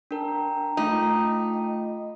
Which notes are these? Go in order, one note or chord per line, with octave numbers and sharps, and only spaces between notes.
D4 A#4 G5 A5 A#5
A3 D#4 F4
G5
D#5